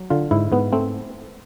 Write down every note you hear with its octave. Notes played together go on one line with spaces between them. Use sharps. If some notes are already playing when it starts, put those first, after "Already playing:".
Already playing: F#3
D3 F4
G#2 E4
G#2 B3
A3 C4